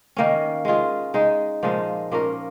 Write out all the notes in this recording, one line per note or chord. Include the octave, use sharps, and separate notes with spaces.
D#3 A#3 C#4
G#3 F4 G#4
G#3 D#4 G#4
A#2 F3 G#3 D#4
A#2 A#3 C#4 A#4